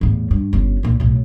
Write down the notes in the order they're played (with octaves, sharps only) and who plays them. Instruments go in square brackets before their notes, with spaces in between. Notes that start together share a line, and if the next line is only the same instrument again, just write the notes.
[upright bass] E2 A2
G2
G1 C#3
C#2 A#2
B1 A2